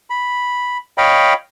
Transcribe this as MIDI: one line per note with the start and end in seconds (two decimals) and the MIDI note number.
0.10 0.77 83
0.98 1.33 73
0.98 1.33 75
0.98 1.33 77
0.98 1.33 79
0.98 1.33 83